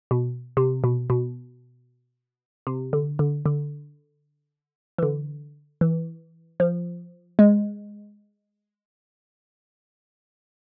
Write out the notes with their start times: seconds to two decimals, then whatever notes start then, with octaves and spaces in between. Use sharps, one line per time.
0.11 B2
0.57 C3
0.84 B2
1.10 B2
2.67 C3
2.93 D3
3.19 D3
3.46 D3
4.98 E3
5.03 D3
5.81 E3
6.60 F3
7.39 G#3